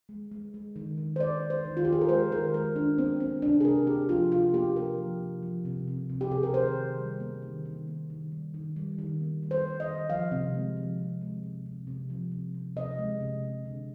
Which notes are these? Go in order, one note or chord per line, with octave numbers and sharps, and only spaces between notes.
G#3
G#3
G#3
D#3
D#3
C5
G#3 D5
D#3
C5
D#3
F4
D#3 G4
G#4
A#4
G#3 C5
D#3 A#4
G#3 A#4
G#3 D4
A#3 C4
A#3 C4
C3 D4
G#4
C3 A#4
A#3 G4
F3 F4
C3 F4
A#3 G4
C3 A#4
F3
C3
F3
C3
C3
C3
G4
C3 G#4
A#4
D#3 C5
D#3
G3
A#3
D#3
D#3
A#3
D#3
G3
D#3
G3
D#3
A#3
G3
C5
A#3
D#5
D#3
F3 F5
C3
G#3
F3
F3
G#3
C3
C3
C3
F3
C3
C3
C3 D#5
G#3
C3
C3
D3